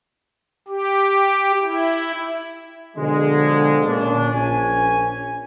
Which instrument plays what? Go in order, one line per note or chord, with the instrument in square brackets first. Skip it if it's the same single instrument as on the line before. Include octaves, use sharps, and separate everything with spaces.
[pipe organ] G4
E4
[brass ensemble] B2 D3 F3 G#3
A#2 C#4 D4
A#1 C#4 G#5